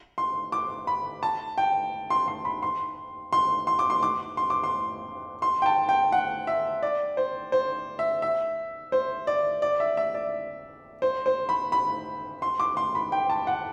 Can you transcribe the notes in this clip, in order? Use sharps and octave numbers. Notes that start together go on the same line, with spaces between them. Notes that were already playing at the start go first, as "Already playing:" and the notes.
C6
D6
B5
A5
G5
C6
C6
B5
C6
C6
C6
D6
C6
D6
C6
D6
C6
C6
G5
A5
G5
F#5
E5
D5
C5
C5
E5
E5
C5
D5
D5
E5
E5
D5
C5
C5
B5
B5
C6
D6
C6
B5
G5
A5
F#5